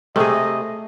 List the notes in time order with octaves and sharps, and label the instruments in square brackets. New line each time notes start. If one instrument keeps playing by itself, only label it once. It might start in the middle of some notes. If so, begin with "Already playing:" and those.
[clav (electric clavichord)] C3 [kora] A3 G#4 [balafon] A4 [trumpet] D#5